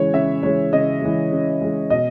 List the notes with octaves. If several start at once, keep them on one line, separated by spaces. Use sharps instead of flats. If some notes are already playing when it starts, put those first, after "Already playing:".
Already playing: C#3 E3 G#3 C#5
C#3 E5
E3 G#3 C#5
C#3 D#5
E3 G#3
C#3
E3 G#3
B2 D#5